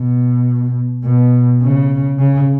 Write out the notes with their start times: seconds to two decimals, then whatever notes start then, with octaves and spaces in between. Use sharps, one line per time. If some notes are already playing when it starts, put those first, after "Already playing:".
Already playing: B2
1.05 B2
1.62 C#3
2.19 C#3